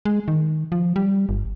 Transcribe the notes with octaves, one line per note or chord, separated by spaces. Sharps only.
G#3
D#3
F3
G3
G1